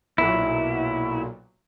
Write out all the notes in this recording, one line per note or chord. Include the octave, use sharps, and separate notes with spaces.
B1 A#2 F#3 E4